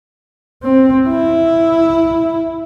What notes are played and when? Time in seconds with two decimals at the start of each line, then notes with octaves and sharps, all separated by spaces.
0.63 C4
1.09 E4